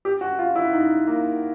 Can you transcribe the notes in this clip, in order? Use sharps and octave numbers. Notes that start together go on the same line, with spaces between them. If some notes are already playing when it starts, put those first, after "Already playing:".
G4
F#4
F4
E4
D#4
A#3